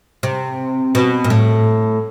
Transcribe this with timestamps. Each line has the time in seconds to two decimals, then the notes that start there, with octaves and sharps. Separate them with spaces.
0.23 C3
0.95 B2
1.24 A#2
1.30 A2